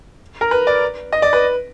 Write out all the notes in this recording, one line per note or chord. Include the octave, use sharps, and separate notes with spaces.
A#4
B4
D5
D#5
D5
B4